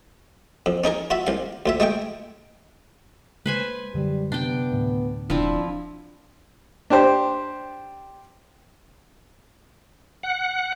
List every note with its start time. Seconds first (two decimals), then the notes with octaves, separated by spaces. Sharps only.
0.66 F2
0.84 C#4 D#4 G#4 A#4
1.10 F4 F#4 E5
1.27 C2 F5
1.66 D2 F4 E5
1.80 G#3 A3 G#4 G5
3.46 G#3 A#3 B4 C5 G#5
3.94 F#2 D3 F#3 G3
4.32 C3 B3 D4 G5
4.72 D2 A2
5.30 E1 F3 C4 D4 E4
6.90 D4 G4 C5
10.23 F#5